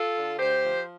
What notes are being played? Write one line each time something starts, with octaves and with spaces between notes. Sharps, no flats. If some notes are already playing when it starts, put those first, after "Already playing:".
Already playing: F4 A4
D3
D2 G4 C5
F3